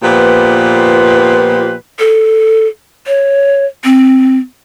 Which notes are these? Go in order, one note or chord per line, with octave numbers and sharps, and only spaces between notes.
A#2 F3 B3 G4 B4
A4
C#5
C4